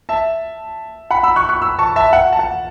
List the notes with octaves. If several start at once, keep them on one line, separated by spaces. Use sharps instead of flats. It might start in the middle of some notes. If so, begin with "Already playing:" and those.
E5 A5
F#5 B5
B5 E6
C#6 F#6
C#6 F#6
B5 E6
A5 C#6
E5 A5
F#5
A5
F#5